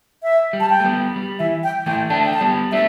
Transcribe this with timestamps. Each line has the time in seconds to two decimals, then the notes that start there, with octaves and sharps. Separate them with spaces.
0.23 E5
0.53 G3
0.60 A5
0.70 G5
0.80 A3
0.85 G3 B3
1.16 G3
1.39 E3 E5
1.64 G5
1.86 E3 A3 G5
2.10 A3 D4 A5
2.26 G5
2.34 A5
2.41 G3 B3
2.72 A3 D4 E5